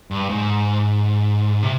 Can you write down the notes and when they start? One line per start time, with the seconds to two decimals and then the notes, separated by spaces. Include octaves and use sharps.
0.11 G2
0.29 G#2
1.63 C3